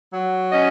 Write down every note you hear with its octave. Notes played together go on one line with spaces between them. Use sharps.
F#3
C#4 D#5